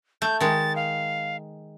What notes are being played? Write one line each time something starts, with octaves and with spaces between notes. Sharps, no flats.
A3 G6
D#3 G#3 A6
F5